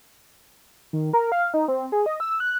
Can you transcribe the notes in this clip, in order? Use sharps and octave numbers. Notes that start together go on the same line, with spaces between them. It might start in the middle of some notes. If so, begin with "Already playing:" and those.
D#3
A#4
F5
D#4
C4
G#4
D#5
E6
F#6